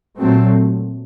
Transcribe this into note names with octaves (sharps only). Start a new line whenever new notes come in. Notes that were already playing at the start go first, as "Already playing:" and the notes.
A#2 F#3 A3 C4